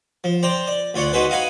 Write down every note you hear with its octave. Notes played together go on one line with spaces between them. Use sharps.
F3
C5 D5 G5 A#5
D5
D2 F4 C#5 D5 F#5
D#4 F#4 G#4 B4 C5
D#5 F5 F#5 G#5 B5